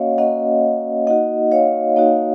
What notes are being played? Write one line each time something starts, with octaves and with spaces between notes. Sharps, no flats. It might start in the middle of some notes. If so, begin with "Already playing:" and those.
Already playing: A#3 C#4 F#4 C#5 D#5 F5 F#5
A#3 C#4 F#4 D#5 F#5
A#3 D#4 F#4 D#5 F#5
C#5 F5
A#3 D#4 F#4 C#5 F5